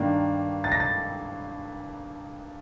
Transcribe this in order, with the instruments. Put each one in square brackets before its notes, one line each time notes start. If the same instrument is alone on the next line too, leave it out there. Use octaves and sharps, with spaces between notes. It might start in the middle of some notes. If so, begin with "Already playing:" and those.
Already playing: [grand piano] G2 D#3 A#3 D4
A6
A#6
A6